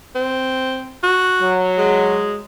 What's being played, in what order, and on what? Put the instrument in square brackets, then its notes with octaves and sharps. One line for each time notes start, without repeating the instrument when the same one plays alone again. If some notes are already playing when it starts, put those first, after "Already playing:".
[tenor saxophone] C4
F#4
[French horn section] F#3
[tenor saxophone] G#3